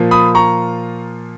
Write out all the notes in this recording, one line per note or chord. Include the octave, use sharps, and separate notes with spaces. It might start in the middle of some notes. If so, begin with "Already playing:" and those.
Already playing: A#2 F3 A#3
B5 D#6
A#5 C#6